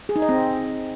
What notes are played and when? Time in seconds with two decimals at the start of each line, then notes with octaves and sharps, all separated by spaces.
0.09 G#4
0.16 D#4
0.22 D#5
0.29 C4